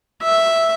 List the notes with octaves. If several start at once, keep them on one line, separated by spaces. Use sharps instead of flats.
E5